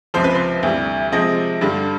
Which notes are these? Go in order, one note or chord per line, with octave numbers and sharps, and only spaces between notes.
C#2 C3 F3 C5
B4
C5
D2 C3 E3 G3
C3 F3 G#3 C4 D#5
G2 D3 G3